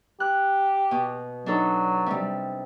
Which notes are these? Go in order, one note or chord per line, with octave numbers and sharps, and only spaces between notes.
G4 F#6
B2
F#3 D4 D#4 A4
C3 G3